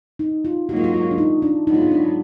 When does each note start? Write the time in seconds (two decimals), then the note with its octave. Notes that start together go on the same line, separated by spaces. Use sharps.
0.19 D#4
0.45 F4
0.69 G#2 F#3 A#3 D#4 F#4
0.76 F4
0.84 F#4
0.94 F4
1.11 D4
1.18 D#4
1.42 D4
1.67 G#2 F#3 B3 D#4
1.74 F4
1.82 D#4
1.91 D4